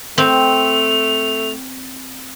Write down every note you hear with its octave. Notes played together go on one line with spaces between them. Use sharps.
A3 C4 F7